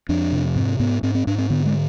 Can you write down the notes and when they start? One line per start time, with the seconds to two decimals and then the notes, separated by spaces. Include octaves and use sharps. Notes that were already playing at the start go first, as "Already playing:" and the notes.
0.09 F2 D4
0.32 C3
0.56 G#2 C4
0.80 G#2 B3
1.03 G#2 C4
1.15 C4
1.27 G#2 D4
1.38 C4
1.50 D3 B3
1.66 G#3